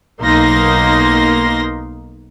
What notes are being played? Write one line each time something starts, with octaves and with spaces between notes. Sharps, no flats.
B1 A#3 D#4 C6 A#6